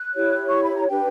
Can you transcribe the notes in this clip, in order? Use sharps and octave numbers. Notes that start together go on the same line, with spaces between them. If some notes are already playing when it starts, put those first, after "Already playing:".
Already playing: F#6
E4 G4 C#5
C#6
B5
A#5
D4 G4 B4 G5